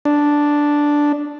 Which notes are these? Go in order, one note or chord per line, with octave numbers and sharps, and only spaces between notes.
D4